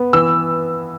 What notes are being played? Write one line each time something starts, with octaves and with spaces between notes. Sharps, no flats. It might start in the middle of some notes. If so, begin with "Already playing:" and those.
Already playing: B3
E3 E6